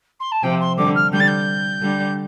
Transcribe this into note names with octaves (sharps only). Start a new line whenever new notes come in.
C6
A5
C3 F3 G5
C6
D3 G3 D6
F6
D3 G3 G6
A6
G6
D3 G3